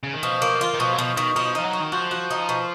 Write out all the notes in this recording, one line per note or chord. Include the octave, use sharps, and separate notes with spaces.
C#3
D#3
B2 F3
A#3
F4
D#3
B2 F3
F#3
B2 F3
B2 D#3
F3 D#4
F3 D#4
F#3
F#4
D#3
F3 F#4
F#4
D#4
B2